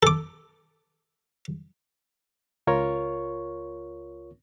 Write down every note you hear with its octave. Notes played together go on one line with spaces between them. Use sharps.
A4 D6
C#2 F4 A#4 C#5 C#6